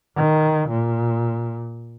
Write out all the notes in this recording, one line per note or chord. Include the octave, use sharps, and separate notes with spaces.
D#3
A#2